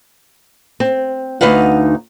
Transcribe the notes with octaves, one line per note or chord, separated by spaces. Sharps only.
C4
D2 D#4 B4 F5 F#5